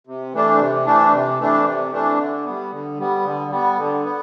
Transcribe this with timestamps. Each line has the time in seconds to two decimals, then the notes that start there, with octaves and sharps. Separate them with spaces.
0.07 C3
0.33 E3 A3 D4
0.59 C3
0.85 E3 A3 D4
1.12 C3
1.40 E3 A3 D4
1.65 C3
1.92 E3 A3 D4
2.19 D3
2.45 G3 B3
2.72 D3
2.99 G3 B3
3.25 D3
3.51 G3 B3
3.78 D3
4.04 B3